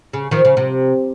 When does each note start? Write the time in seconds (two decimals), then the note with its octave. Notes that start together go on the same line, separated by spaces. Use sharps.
0.13 C#3
0.31 D#3 F3
0.45 C#3
0.57 C3